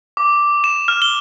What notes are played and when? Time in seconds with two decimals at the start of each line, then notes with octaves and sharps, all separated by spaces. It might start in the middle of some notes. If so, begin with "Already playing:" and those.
0.17 D6
0.64 E7
0.88 F6
1.02 G7